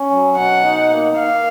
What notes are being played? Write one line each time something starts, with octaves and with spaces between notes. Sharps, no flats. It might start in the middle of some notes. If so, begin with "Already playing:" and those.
Already playing: C#4
F#3
B2 F#5
D#4
A#3
A#3 F5